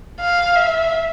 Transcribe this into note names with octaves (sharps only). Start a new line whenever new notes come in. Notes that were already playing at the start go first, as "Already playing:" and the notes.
F5
E5